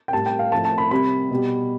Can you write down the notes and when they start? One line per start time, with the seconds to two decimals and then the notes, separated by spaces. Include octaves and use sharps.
0.08 G5
0.13 A2 G3 A5
0.26 G5
0.39 F5
0.52 A2 F3 A3 A5
0.65 A5
0.78 B5
0.91 C3 G3 B5
1.31 B2 G3